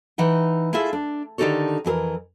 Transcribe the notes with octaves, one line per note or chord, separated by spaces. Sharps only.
E3 D#4 F#5 G5
E4 F4 G#4 A4 E5
D4
D3 D#3 D#4 G4 A4 C#5
F2 E3 G#4 A#4